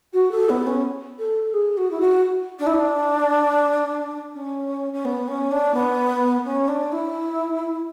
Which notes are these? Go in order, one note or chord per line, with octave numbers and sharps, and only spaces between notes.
F#4
A4
B3
C#4
A4
G#4
F#4
E4
F#4
D4
E4
D4
C#4
C#4
B3
C#4
D4
B3
C#4
D4
E4